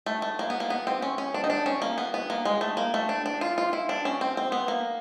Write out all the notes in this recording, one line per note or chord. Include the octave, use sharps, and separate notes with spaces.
A3
A3
A#3
B3
A#3
B3
C4
C#4
C#4
D4
D#4
D4
C#4
A#3
B3
B3
A#3
G#3
A3
A#3
A3
D4
D4
F4
F4
E4
D4
C#4
C4
C4
B3
A#3